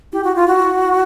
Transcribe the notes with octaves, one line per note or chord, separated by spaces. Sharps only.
E4 G4
F#4
F4
F#4